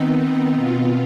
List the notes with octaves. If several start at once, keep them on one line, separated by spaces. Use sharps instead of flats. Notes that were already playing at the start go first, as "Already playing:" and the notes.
Already playing: D#3 B3 C4 D#4
B2 B3 F4